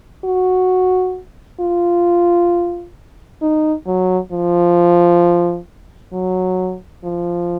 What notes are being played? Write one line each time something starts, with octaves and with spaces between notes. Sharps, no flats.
F#4
F4
D#4
F#3
F3
F#3
F3